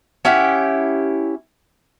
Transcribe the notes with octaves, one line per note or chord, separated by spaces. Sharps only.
C#4 E4 G4 F#5